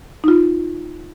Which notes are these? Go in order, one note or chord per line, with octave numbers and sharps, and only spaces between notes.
D#4 F4